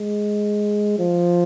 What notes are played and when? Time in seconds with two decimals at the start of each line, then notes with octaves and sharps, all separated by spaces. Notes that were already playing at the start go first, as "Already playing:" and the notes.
Already playing: G#3
0.99 F3